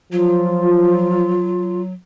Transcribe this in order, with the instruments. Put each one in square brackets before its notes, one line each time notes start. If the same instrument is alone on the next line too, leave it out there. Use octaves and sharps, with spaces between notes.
[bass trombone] F3 [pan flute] F#3 [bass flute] F4